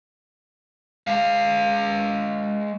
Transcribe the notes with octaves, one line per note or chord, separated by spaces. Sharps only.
G#3 F5